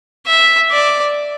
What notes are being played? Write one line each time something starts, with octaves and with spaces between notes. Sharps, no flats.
E5
D5